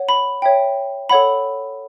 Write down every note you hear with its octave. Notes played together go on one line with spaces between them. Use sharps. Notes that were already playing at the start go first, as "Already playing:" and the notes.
Already playing: C#5 F#5
B5
C#5 E5 G5
A4 C#5 F#5 B5